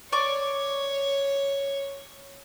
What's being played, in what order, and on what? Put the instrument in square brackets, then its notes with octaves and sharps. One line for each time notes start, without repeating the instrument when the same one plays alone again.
[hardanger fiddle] C#5 [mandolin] D5 C#6 D6